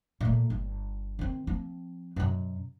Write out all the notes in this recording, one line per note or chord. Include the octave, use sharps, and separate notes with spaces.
A#2 A3
G1
D#3 C4
F3 C4
F#2 B2